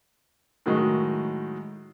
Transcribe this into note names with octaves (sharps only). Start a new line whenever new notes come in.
A2 D#3 F#3 G#3